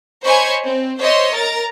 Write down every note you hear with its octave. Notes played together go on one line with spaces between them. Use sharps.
C5 C#5 D#5 G#5 B5 C#6
C4
C5 C#5 D#5 E5 C6
A#4 A#5 A6